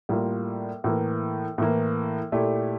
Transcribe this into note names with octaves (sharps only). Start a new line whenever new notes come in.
A2 G3 A#3 F4
A2 E3 A#3
A2 E3 A#3
A#2 A3 E4 G4